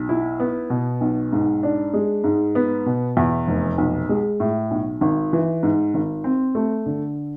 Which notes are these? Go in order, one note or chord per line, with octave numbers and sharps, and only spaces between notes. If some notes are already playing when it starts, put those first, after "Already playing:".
Already playing: B1
E4
B3
B2
B1
G#2
D4
G#3
G#2
B3
B2
E2
F1
B1
G#3
A2
B1
G#1
E3
G#2
G#1
C4
A3
D3